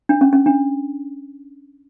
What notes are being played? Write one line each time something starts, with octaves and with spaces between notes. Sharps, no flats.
D4
C#4
C#4
D4